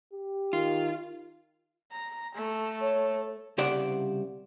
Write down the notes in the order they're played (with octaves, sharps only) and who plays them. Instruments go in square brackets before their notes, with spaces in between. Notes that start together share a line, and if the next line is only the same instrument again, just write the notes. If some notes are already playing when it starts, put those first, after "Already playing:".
[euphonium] G4
[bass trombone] D#3 [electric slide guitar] F4
[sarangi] A#5
A3
[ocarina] C#5
[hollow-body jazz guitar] C2 C#3 G4 C5 D5 F#5